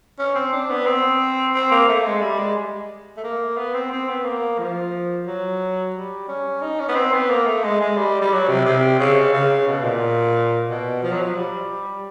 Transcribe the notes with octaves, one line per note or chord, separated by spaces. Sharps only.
C#4
C4
D4
B3
C4
C4
A#3
A3
G#3
G3
G#3
A3
A#3
B3
C4
C4
B3
A#3
F3
F#3
G3
C#4
D#4
C#4
B3
C4
B3
A#3
A3
G#3
G#3
G3
G3
F#3
C3
C3
C#3
C#3
B2
A#2
B2
F3
F#3
F3
G3